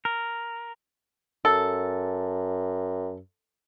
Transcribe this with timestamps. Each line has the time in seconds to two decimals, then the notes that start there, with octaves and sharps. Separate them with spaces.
0.05 A#4
1.45 F#2 A4